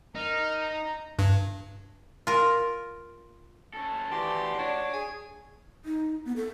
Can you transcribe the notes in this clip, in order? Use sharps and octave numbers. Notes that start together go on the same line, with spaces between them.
D#4 A#4 F6
A#5
G2
F4 A#4
C#4 A4 A5
E3 F#4 G4 D5 C6
D4 C#5
G#4 G#5
D#4
B3
A4